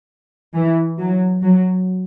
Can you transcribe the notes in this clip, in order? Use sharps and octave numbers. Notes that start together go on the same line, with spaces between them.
E3
F#3
F#3